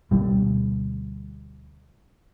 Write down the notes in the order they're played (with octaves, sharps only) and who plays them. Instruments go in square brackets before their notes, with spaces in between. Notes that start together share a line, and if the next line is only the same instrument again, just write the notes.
[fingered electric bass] D2 B2 G3 A#3